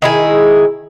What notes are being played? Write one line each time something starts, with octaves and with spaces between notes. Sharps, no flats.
D#3 E4 G#4